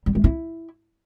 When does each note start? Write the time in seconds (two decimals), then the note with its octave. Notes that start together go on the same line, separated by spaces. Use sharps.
0.06 G3
0.15 G#3
0.24 E4